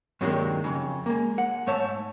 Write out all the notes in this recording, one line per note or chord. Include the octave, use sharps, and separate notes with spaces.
G2 C3 D#3 F#3 G#3 A#3
F2 C#3
G#3 A#3
F#5
G#2 A3 C#5 E5 A5